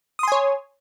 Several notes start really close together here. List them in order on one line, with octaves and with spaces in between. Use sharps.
D#6 C6 G#5 C#5